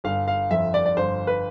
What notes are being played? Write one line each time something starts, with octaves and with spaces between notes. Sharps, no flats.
G1 F5
F5
F2 E5
D5
D5
G1 C5
B4